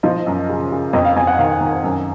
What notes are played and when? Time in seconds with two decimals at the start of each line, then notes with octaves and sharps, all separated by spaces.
0.03 F3 D#5
0.27 F#2
0.49 C#3
0.72 C#3
0.93 F2 D#5
1.05 F5
1.16 F2 G#5
1.27 F#5
1.39 D#3 F5
1.61 D#3
1.84 F#2